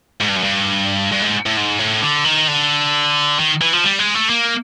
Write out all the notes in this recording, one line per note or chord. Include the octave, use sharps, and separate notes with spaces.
G#2
G2
F#2
G2
G2
G#2
A2
G#2
A2
D3
D#3
D3
D#3
E3
F3
G3
G#3
A3
A#3